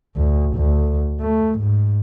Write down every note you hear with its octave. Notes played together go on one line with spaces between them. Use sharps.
D2
D2
A3
G#2